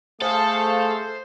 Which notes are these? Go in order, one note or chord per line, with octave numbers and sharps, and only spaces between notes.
A3 G#4 A4 C5 E5 F5